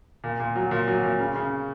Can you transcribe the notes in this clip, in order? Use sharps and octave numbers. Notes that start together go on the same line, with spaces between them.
A#2
A#2
F#3
A#2
F#3
A#2
C#3
C#3